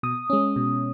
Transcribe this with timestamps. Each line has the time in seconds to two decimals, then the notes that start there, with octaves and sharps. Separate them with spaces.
0.03 B2 D#6
0.30 G#3 C#4
0.56 B2